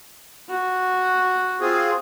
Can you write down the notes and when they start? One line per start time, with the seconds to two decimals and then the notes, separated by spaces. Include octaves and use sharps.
0.49 F#4
1.61 C4 F4 G#4